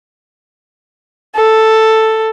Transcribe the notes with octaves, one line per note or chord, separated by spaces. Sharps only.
A4